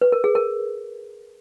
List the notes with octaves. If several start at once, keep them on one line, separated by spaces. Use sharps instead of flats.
B4
A#4
G#4
A#4